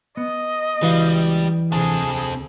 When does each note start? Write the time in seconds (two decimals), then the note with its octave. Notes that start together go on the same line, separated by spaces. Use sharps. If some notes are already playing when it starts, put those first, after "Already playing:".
0.17 B3 D#5
0.83 C#2 E3 G3 F#4 F5
1.73 D2 C3 C4 G#4 A4